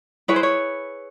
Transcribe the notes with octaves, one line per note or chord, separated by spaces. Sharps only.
E4 G#4 B4 C#5
C5
C#5